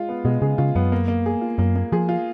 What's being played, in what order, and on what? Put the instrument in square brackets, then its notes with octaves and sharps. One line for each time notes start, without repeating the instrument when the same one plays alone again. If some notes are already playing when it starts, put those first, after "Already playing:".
Already playing: [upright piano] G#3 F4
B3
[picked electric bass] B2 [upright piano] G#3
[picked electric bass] C#3 [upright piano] G#4
[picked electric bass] C#3 [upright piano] F4
[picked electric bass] F#2 [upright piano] B3
[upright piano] A#3
A#3
G#4
F4
[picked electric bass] F#2 [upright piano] A#3
[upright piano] A#3
[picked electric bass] F3 [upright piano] G#4
[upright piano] F4